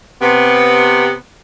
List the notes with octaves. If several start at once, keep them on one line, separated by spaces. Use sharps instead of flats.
C3 B3